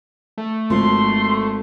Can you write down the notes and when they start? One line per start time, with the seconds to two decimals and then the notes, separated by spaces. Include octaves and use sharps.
0.38 A3
0.70 G#1 F3 C6